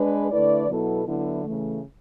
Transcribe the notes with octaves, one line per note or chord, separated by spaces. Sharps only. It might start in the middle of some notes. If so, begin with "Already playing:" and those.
Already playing: G#3 D4 G#4 B4
D3 A3 E4 B4 D5
B2 F#3 B3 E4 A4
D3 F#3 B3 E4
C#3 E3 A3